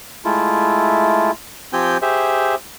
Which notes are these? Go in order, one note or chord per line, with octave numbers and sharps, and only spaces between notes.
G#3 A3 E4 F4
F3 C4 G4 G5 G#5 G6
G4 G#4 C5 E5